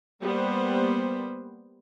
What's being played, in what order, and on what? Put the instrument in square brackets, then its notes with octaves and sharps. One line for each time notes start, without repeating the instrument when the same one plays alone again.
[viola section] G3 A#3 B3 C5